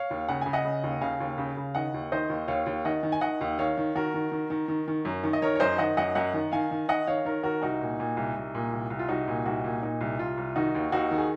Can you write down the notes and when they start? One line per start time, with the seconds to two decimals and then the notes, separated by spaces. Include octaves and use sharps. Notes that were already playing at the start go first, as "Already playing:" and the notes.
Already playing: C#5 F5
0.10 D#2
0.28 C#3 F#5
0.41 C#3 G#5
0.53 D#5 F#5
0.65 C#3
0.83 D#2
1.01 C#3 F5 G#5
1.20 D#2
1.38 C#3
1.57 C#3
1.75 D#3 D#5 F#5
1.94 D#2
2.12 D#3 C5 D#5
2.30 D#2
2.48 D#2 C#5 F5
2.66 D#2
2.85 D#3 D#5 F#5
3.03 D#3
3.12 G#5
3.21 D#3 D#5 F#5
3.41 D#2
3.58 D#3 C#5 F5
3.78 D#3
3.95 D#3 F#4 A#4
4.14 D#3
4.32 D#3
4.50 D#3
4.68 D#3
4.88 D#3
5.05 F#2
5.23 D#3
5.33 D#5
5.42 D#3 A#4 C#5
5.55 C#5
5.60 F#2 C5 D#5
5.78 D#3 D#5 F#5
5.97 F#2 D#5 F#5
6.15 F#2 D#5 F#5
6.34 D#3
6.52 D#3 F5 G#5
6.71 D#3
6.88 D#3 D#5 F#5
7.07 D#3 C#5 F5
7.25 D#3 A#4 C#5
7.43 D#3 F#4 A#4
7.62 C2 D#4 F#4
7.81 A#2
8.00 A#2
8.17 C2
8.36 C2
8.55 A#2
8.72 C2
8.90 C2
8.99 F4
9.09 C2 D#4 F#4
9.28 A#2
9.45 C2 D#4 F#4
9.64 A#2
9.82 A#2 D#4
10.01 C2
10.19 C2 F4
10.38 C2
10.56 D#3 D#4 F#4
10.75 D#2
10.92 D#2 D#4 F#4
11.11 D#3
11.18 G#4